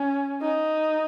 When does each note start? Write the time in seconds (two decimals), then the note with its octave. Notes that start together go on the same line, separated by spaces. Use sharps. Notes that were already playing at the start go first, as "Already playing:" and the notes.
Already playing: C#4
0.42 D#4